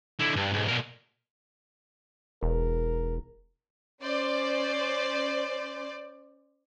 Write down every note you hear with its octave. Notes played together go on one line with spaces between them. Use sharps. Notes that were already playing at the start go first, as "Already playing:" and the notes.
D3 E4
G2
B1 G#2
B2 A#4
E1 A#4
C#4 C5 D5